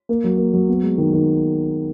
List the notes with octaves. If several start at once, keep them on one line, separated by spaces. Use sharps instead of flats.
A#3
F#3
A#3
F#3
B3
G#3
D#3
D#3